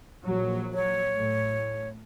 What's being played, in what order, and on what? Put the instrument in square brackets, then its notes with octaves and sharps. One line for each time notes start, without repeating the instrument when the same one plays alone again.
[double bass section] A#1 F#3
[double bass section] F#3 [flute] C#5
[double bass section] A2